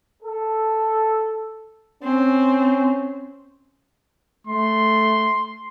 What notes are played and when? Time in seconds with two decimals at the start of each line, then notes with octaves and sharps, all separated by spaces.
0.23 A4
2.03 C4 C#4
4.47 A3 C6